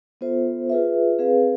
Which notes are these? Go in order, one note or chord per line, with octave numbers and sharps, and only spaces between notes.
B3 F4 A4 C5 E5
F4 G#4 B4 E5
C4 G#4 B4 F5